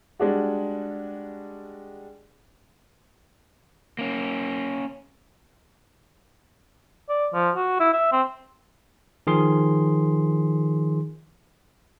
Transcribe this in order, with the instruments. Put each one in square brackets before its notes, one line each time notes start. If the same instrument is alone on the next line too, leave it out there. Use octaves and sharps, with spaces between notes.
[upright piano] G3 G#3 D4 F#4
[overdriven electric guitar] A#3 C#4
[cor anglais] D5
F3
F#4
E4
E5
C4
[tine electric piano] D#3 F3 G#4 C6